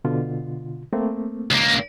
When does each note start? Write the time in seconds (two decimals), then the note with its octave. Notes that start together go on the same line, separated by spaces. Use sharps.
0.05 B2 D3 F4
0.93 A3 A#3 C4
1.51 C#2 A#3